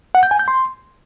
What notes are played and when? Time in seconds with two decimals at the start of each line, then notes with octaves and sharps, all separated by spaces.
0.15 F#5
0.23 G6
0.31 G#5
0.39 G6
0.48 C6